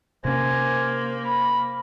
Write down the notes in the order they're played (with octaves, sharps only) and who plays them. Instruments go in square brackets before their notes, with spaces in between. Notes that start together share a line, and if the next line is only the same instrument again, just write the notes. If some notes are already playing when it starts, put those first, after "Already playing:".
[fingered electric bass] C3 C#4 [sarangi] A#3 [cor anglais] C5 [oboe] G#5
[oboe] B5